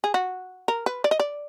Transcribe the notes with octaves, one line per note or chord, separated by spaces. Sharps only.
G#4
F#4
A#4
B4
D5
D#5
D5